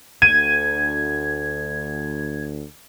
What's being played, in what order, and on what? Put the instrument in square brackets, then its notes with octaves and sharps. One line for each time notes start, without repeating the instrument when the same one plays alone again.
[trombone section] D2 [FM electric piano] G#6 [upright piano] D#7